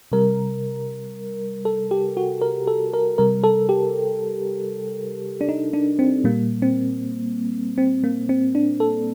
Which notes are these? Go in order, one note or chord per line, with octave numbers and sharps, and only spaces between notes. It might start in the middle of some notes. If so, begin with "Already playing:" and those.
C3 G3 A#4
A4
G4
F#4
A#4
A4
A#4
C3 G3 A#4
A4
G4
D4
D#4
D4
C4
A#2 G3 A#3
C4
C4
A#3
C4
D4
A4